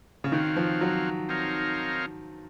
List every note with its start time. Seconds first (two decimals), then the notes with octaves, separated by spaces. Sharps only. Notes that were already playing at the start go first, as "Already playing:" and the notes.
0.24 C#3
0.32 D#3 C4 F#4 C#5 F5
0.56 F3
0.81 F#3
1.29 C4 D#4 A#4 C#5 F5